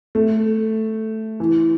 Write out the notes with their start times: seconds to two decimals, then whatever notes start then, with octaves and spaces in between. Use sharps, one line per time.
0.15 A3
1.40 E3